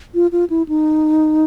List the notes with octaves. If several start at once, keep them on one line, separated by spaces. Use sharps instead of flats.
F4
F4
E4
D#4